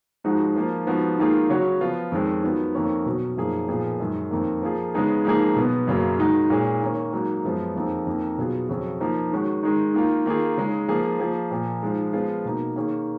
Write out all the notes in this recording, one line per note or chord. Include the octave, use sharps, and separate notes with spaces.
G#2 F3 G#3 D#4 F#4
F3 A#3 F4
G#2 F3 B3 F#4
G#2 D#3 A#3 F4 G#4
C#3 F#3 C#4 F#4
F3 B3 F4
F2 D#3 G#3 C#4
D#3 F#3 B3 F4
F2 D#3 A#3 C#4
B2 F#3 C#4
F#2 F3 A#3 D#4 G#4
A#2 F3 B3 F4 G#4
F#2 D#3 G#3
F2 D#3 A#3
F3 A#3 F4 G#4
C#3 G#3 B3 D#4 G#4
G#2 F3 A#3 D#4 G#4
B2 F#3 B3
F#2 C#3 F#3 A#3
D#3 G#3 D#4 F#4
A#2 G#3 C#4 G#4
D#3 A#3 C#4
G#2 F#3 A#3
F#2 F3 G#3 B3
F2 F3 A#3 D#4 G#4
F2 F3 A#3 D#4
B2 F#3 B3 F4 G#4
F2 C#3 F#3 C#4
F3 A#3 D#4
D#3 G#3 C#4 F#4
D#3 G#3 D#4
D#3 A#3 F4
D#3 A#3 F4 G#4
C#3 G#3 D#4
F3 A#3 F4 G#4
F3 A#3 F4 G#4
A#2 F3 A#3
G#2 F3 G#3
F3 G#3 B3 F4 G#4
B2 A#3 D#4
D#3 A#3 C#4 G#4